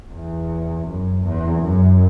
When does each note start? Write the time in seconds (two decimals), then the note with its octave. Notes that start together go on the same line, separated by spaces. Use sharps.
0.12 E2
0.87 F#2
1.24 E2
1.62 F#2